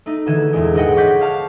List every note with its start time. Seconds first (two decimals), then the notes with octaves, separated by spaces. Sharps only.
0.06 A3 D#4
0.26 B2 D3 E3 D#4 G#6 E7
0.53 E2 A#2 G#3
0.74 A#1 G#2 B4 D#5 F#5 G5
0.96 C#5 F#5 C#6 D6 G6 B6
1.21 F5 A5 F6